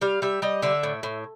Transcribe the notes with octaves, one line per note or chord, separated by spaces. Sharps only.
G3 F5
G3 E5
G3 D#5
D3 E5
A2
A2